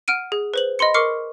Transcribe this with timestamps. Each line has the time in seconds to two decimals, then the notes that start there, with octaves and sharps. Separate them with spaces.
0.08 F#5 F6 D7 D#7
0.32 G#4
0.54 B4 C5 F#7
0.79 D#5 B5 C6 C#7
0.94 A#4 C#6 D6 F6 C7 C#7